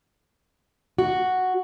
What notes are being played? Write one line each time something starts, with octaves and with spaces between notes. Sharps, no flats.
F#4